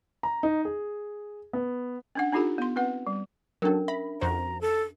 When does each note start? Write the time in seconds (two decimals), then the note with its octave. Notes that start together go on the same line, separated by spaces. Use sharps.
0.23 A#5
0.43 D#4
0.65 G#4
1.53 B3
2.15 C#4 D4 F#5
2.32 D4 D#4 F4 G4 A4 A#5
2.58 B3 C6
2.76 C4 B4 F#5
3.07 G3
3.62 F#3 C#4 D4 A4 A#4
3.88 E5 B5
4.21 F2 F#4 C5 A#5
4.61 A4